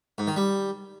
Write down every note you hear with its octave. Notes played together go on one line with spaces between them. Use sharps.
G#2
D#3
G3